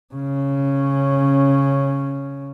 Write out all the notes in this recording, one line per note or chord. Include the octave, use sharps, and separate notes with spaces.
C#3 C#4